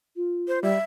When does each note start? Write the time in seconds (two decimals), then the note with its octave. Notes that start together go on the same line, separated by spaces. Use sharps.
0.16 F4
0.48 C5
0.63 G3 E5